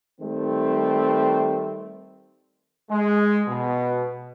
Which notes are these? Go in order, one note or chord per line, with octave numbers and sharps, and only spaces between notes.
D#3 G3 A3 C4
G#3
B2